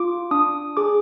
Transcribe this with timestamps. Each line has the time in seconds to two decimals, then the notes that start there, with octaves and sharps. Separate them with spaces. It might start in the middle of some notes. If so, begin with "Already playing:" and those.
Already playing: F4 D6
0.31 D4 D#6
0.77 G#4 D6